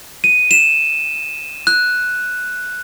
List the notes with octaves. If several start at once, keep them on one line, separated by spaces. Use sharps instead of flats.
D#7
E7
F#6